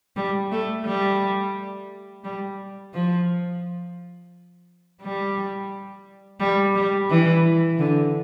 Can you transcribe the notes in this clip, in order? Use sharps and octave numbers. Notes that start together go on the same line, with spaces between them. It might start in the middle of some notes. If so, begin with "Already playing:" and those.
G3
A3
G3
G3
F3
G3
G3
G3
E3
D3